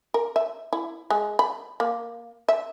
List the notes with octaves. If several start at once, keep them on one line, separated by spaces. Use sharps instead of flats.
A#4
E5
E4
G#3
B5
A#3
E5